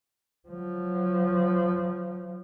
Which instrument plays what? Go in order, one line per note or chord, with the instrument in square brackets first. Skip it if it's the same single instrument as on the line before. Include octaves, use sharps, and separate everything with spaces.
[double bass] F3 F#3